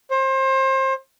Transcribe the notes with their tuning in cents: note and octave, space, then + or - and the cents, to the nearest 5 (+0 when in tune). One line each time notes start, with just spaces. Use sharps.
C5 +30